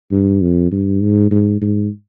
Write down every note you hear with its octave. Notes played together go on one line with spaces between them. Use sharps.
G2
F2
G2
G#2
G#2
G#2